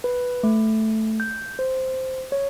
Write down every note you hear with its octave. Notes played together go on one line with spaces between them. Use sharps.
B4
A3
G6
C5
C#5